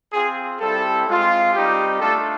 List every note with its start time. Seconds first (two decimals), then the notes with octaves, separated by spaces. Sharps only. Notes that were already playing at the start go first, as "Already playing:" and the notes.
0.13 C4 F4 G#4
0.60 G3 C4 E4 G4 A4
1.07 G#3 C4 F4
1.53 G3 C4 D#4 G4
2.00 A3 D4 F4 A4